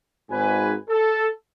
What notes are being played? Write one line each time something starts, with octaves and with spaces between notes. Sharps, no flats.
G#1 G#2 B4 G#5
A4